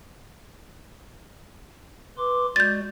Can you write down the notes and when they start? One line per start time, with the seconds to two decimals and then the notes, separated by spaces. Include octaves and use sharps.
2.18 B4 C6 D6
2.56 G#3 F#4 D5 G6 A6